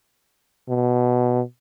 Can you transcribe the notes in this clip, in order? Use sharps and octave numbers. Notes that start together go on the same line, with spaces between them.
B2